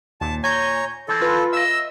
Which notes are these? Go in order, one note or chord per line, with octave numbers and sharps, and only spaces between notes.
D#2 A#2 A5
C#5 G#5 A#5 G6
E3 C4 A4
F4 B4
D#5 E5 E6